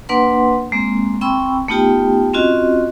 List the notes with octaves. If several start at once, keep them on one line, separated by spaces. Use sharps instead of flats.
A#3 D4 B4 F#5 C6
G#3 A#3 C4
C4 G5 B5 C#6 E6
A3 B3 D#4 F4 G4 G5
C4 C#4 F4 F#4 D#5